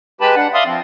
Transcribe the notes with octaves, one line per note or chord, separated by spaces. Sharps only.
G#3 G4 B4 A5 B5
D4 F#5
D5 E5 F5 C6 D#6
F3 C4